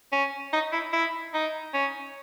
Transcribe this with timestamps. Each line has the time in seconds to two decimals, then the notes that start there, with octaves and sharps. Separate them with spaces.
0.12 C#4
0.53 D#4
0.72 E4
0.93 E4
1.34 D#4
1.73 C#4